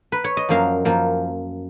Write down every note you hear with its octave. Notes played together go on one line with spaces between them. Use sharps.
B4
C#5
D#5
F#2 F3 A#3 F5
F#2 F3 A#3